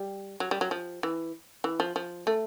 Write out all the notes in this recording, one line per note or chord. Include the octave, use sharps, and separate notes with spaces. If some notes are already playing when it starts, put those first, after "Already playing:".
Already playing: G3
F#3
G3
F#3
F3
E3
E3
F3
F3
A3